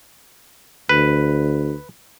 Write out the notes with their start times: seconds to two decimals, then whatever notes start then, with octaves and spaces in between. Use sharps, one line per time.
0.89 D2 B4